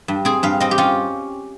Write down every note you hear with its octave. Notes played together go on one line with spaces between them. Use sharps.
G2
C4 G#4
G2 F5
C4 D#5
G4
C#4 F4